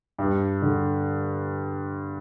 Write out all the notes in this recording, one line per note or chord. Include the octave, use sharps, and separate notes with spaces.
G2
D3